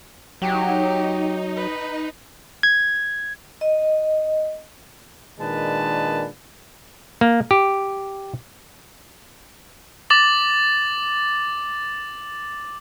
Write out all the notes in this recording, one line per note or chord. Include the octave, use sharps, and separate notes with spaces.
F#3 D#4 G4
B4
G#6
D#5
A#2 D#3 G#3 D4 B4 A5
A#3
G4
D6 A6 F#7